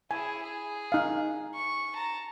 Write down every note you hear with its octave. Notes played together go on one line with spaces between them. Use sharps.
E4 G#4 G#5
G#4
D#4 F5
C#6
A5 A#5